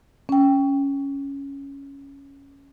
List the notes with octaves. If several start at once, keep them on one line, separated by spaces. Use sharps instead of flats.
C#4 G5